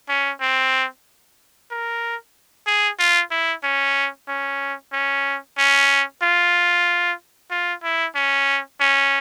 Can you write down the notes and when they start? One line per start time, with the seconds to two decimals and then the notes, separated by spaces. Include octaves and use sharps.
0.09 C#4
0.41 C4
1.71 A#4
2.67 G#4
2.99 F4
3.31 E4
3.63 C#4
4.28 C#4
4.92 C#4
5.58 C#4
6.22 F4
7.51 F4
7.84 E4
8.15 C#4
8.80 C#4